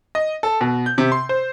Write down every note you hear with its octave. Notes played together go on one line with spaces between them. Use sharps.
D#5
A4
B2
G6
C3
C6
C5